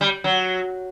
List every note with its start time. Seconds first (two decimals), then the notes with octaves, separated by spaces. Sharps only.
0.01 G3
0.24 F#3